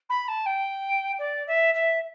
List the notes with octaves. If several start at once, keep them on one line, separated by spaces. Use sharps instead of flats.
B5
A5
G5
D5
E5
E5